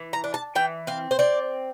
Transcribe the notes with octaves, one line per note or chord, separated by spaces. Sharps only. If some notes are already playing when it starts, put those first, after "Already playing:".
Already playing: E3
A#5
D4
A5
E3 G5
C4 F5
C5
C4 D5